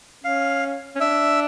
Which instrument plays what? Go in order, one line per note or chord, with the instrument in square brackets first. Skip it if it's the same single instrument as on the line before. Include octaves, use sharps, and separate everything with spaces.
[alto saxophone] C#4 [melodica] F5
[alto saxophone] C#4
[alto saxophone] D4 [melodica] E5